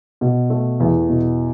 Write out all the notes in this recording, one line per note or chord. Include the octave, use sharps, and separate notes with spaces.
B2
A3
E2
B2